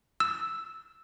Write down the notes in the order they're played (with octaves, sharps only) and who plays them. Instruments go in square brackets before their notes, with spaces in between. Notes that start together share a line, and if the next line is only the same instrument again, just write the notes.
[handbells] E6